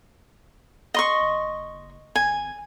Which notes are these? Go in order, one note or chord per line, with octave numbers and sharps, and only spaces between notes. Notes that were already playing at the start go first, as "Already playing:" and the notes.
D#5 C6 C#6
F#1
G#1 G#5